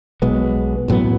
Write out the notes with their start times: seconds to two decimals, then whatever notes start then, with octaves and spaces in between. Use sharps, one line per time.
0.22 B1 B2 G#3 B3
0.88 A1 A2 F#3 B3